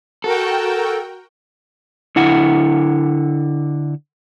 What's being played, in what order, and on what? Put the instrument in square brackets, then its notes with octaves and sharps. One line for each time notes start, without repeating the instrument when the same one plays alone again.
[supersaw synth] F#4 A#4 G5 [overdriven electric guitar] A4
[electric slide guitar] D3 E4 F#5